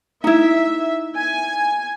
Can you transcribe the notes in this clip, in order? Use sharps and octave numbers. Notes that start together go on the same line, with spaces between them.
D#4 E4 E5
G#5